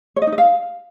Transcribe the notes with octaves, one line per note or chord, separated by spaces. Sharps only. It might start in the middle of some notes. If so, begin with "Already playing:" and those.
C#5
D#5
D#4
D#5
F5